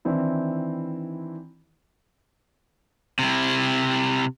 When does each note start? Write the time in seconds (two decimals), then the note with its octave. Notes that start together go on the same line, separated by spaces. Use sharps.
0.05 D#3 E3 C4 D4 E4
3.19 C3 E4